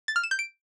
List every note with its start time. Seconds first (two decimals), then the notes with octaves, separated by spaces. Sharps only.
0.08 A6
0.16 F6
0.23 E7
0.31 G6
0.39 D7